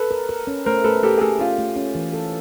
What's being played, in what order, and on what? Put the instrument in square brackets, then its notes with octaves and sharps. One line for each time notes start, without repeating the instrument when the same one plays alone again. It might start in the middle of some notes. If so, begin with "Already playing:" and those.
Already playing: [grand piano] A4 B4
[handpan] A#4
A#4
C#4
[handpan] A3 [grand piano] A#4 C5
[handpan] A3 [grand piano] A4 B4
[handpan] A3 [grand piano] G4 A4
[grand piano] G#4
[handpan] A3 [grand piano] G4 A4
[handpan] C#4 [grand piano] F4 G4
[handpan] A3
C#4
E3
A4